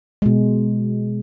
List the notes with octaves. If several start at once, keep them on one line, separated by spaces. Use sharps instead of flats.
B2 G#3